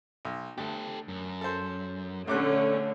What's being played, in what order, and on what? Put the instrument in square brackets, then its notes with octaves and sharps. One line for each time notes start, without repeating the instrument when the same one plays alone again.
[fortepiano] B1
[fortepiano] D2 [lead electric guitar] G4 A4
[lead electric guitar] F#2
[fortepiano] A4 C5
[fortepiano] A#1 D6 F#6 [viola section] D3 A3 [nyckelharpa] C#4 C#5